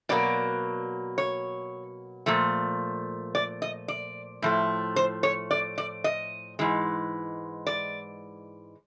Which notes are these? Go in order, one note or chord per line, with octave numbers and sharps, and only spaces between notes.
B2 F#3 A#3 D5
C#5
A#2 F3 A3
D5
D#5
D5
A2 F3 A3
C5
C#5
D5
D5
D#5
G#2 E3 G#3
D5